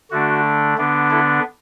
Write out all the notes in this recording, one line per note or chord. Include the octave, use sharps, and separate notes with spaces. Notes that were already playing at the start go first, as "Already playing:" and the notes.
D3 A3 D4 F#4
D3 B3 D4
E4 A4